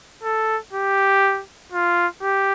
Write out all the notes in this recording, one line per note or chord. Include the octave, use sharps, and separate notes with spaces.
A4
G4
F4
G4